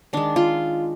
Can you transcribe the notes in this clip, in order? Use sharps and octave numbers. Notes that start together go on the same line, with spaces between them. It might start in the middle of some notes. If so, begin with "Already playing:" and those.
D#3 G#3 D4
F4